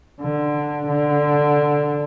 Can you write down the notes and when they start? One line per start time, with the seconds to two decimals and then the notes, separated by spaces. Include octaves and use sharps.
0.21 D3
0.87 D3